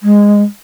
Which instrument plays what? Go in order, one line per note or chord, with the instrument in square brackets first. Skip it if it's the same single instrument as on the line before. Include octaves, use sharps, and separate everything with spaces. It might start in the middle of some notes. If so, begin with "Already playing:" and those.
[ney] G#3